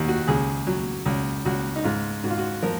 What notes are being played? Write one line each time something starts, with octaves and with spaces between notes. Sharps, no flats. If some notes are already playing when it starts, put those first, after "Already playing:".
Already playing: D#2
F#4
C#2 G#4
F#3
C#2
C#2 F#4
D#4
G#2 F4
G#2 F#4
F4
F#4
F3 A#4